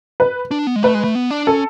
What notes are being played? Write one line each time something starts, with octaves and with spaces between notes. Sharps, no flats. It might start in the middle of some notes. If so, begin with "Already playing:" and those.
B4
D4
B3
G#3
A3 B4
G#3
A3
B3
D4
C#4 A4